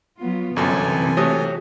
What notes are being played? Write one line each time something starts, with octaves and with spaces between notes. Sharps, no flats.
F#3 B3 F4
G1 F#2 C3 E3 A4 G#5
A3 F#4 G4 C#5 D#6